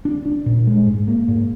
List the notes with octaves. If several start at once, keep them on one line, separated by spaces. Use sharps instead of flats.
D4
D4
A#2
G#3
G#2
A#3
G#2